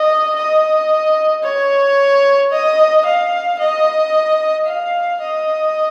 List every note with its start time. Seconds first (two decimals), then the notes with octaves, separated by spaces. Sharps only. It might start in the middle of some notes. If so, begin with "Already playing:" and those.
Already playing: D#5
0.36 D#5
1.44 C#5
2.52 D#5
3.05 F5
3.59 D#5
4.67 F5
5.21 D#5